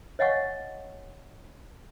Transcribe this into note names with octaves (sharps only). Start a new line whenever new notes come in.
C#5 D#5 F5 F#5 G#5 C#6